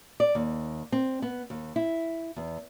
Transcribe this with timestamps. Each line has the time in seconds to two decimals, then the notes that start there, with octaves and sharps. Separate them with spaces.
0.20 D5
0.35 D#2
0.92 C4
1.22 B3
1.50 D#2
1.76 E4
2.36 E2